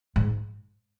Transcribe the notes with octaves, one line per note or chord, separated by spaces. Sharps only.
G#2